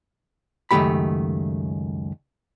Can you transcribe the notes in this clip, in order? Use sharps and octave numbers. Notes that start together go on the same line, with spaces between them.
C#2 F#2 D#3 A3 G4 B5